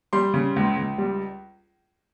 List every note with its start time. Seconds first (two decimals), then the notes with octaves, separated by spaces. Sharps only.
0.13 G3 C6
0.34 C#3
0.56 C#2
0.77 C#2
0.98 G3